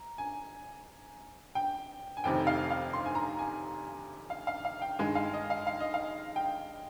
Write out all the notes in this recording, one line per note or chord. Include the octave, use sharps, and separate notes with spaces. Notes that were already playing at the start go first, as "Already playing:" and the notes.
Already playing: A#5
G#5
G5
G#5
F1 F2 C3 D#3 G5
F5
F5
C6
G#5
A#5
G#5
F5
F5
F5
G5
G2 D#3 G#3 G#5
F5
D#5
F5
F5
D#5
F5
G5